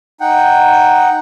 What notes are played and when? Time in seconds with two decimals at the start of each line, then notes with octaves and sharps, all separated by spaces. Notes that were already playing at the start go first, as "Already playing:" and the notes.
0.21 D#4 F#5 G5